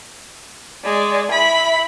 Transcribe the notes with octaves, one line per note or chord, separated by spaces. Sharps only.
G#3 D5
E4 B5